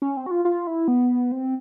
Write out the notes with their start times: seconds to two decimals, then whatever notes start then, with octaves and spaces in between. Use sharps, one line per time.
0.02 C#4
0.17 C4
0.26 F#4
0.31 F4
0.45 F4
0.67 E4
0.88 B3
1.32 C4